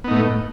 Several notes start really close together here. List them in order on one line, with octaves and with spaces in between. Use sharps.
B3 D#4 A2